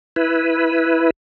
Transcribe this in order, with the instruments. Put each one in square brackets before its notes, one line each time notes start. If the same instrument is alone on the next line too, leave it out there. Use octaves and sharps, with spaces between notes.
[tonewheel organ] E4 B4